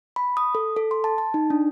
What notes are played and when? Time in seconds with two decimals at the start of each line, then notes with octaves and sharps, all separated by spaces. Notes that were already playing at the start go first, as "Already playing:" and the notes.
0.16 B5
0.37 D#6
0.55 A4
0.76 A4
0.91 C6
1.04 A5
1.18 A5
1.34 D#4
1.50 D4